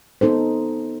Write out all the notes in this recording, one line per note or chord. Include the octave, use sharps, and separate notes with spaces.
B3 D#4 A4 C5